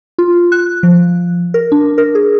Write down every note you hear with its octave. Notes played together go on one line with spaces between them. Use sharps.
F4
F#6
F3
A#4
D4
A#4
G#4